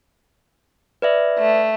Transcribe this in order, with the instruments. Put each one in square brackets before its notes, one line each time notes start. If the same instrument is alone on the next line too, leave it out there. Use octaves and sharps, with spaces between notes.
[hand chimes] B4 D5 E5
[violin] A3